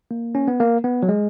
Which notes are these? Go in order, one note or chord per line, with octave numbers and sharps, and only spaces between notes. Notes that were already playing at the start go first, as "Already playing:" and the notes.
A#3
C#4
B3
A#3
B3
F#3
G#3